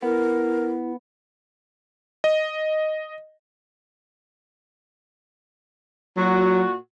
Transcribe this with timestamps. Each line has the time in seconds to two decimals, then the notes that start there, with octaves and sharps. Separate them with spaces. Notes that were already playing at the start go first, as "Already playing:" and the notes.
0.03 B3 E4 A#4
2.24 D#5
6.17 A#2 F#3 F#4